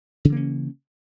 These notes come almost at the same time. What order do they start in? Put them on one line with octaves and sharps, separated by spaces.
C#3 E3 A#3 C#4